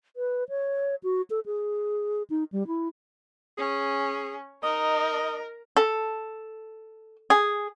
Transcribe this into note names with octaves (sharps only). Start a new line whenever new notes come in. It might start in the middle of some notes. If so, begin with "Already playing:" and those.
B4
C#5
F#4
A4
G#4
D#4
G3
E4
C#4 G#4
D#4 A#4 D#5
A4
G#4